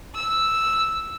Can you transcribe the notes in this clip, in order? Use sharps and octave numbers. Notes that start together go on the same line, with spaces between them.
E6